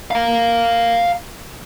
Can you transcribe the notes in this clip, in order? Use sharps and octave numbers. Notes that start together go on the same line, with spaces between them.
F5 A#5